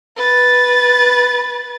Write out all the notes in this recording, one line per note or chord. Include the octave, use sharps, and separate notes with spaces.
B4 A6